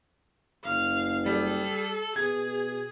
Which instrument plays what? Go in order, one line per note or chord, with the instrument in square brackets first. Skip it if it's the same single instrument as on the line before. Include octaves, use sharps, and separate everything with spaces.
[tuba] F#1 [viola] F5
[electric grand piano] G3 [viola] A4
[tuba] B2 [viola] G#4 [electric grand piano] G#6